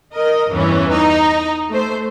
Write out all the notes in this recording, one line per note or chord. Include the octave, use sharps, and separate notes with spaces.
A#4 D#5
E2 G2 E3 C#4
D#4
A3 C5